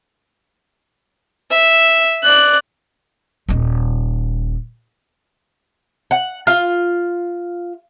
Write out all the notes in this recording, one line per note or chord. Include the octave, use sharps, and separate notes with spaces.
E5
D5 F#6
D#1 D#4
F#5
F4